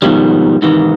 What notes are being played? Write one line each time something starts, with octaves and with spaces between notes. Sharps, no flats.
G#2 B2 D#3 F3 G3
G#2 C3 D#3 E3